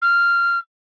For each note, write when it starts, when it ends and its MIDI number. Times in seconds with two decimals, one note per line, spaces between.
0.02 0.59 89